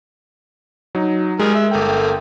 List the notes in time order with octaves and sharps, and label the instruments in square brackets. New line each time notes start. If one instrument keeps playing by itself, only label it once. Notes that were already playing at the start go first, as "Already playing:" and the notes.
[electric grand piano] F#3 D#4
[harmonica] G3 G#4 A#4 [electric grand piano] G#3
[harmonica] E5
[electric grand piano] G1 G5 [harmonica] A3 A#3